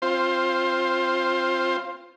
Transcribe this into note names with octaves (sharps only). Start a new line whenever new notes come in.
C4 F4 C5